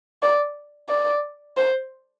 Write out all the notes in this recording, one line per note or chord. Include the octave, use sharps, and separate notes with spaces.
D5
D5
C5